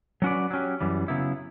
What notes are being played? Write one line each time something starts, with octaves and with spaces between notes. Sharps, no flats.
F#3 C#4 F#4 B4 D5
F#3 C#4 G4
F#2 E3 G3
C#3 F#3 B3 E4